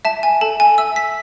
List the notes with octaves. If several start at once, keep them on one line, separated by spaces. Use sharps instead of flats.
E5 A5
G#5
A4 A5
G#5
E5 E6
B6